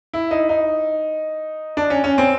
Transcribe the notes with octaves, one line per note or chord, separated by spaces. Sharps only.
E4
D#4
D#4
D4
C#4
C#4
C4